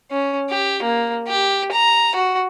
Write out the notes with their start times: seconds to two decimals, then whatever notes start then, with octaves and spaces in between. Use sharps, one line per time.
0.11 C#4
0.50 G4
0.82 A#3
1.28 G4
1.72 A#5
2.15 F#4